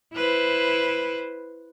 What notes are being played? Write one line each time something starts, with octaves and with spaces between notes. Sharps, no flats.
E4 B4 C5